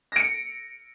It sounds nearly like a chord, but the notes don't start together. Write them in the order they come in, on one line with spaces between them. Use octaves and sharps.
A#6 D7 C#7